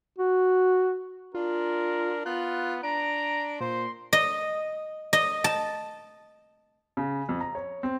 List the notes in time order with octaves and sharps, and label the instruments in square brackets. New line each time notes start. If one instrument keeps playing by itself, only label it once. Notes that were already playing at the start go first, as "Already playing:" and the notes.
[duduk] F#4
[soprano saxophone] D4 [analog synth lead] F4 [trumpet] A#4
[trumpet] B3 [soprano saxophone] F4 [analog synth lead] F#6
[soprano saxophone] D4 [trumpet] A#5 [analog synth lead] D7
[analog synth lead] A#2 [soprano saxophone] C5 [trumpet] C6
[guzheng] D#5
D#5
A5
[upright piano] C#3
F2
A#5
C#5
C4